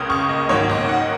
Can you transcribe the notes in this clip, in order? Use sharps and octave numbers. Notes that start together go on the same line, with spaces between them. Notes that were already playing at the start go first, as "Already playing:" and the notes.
Already playing: C#2 C#3 A#3 C#4 D#6
C#6
D#5
G#2 D#3 F#3 A#3 C#5
D#5
D#5
F#5